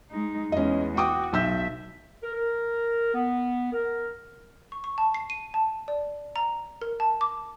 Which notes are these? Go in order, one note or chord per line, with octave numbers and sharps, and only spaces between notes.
G#3 D#4
E2 G#3 C#4 D#5
F#4 G5 D6 D#6
B1 E5 E6 G6
A#4
A#4
B3
A#4
C#6
C#6
A5
C7
D#7
A5
D5
A#5
A#4
A5
D6